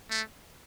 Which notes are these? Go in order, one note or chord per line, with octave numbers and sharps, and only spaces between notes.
A3